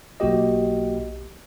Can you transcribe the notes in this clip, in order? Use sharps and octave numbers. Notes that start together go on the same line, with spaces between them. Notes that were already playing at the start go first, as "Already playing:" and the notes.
B1 A#3 F#4 G4 D#5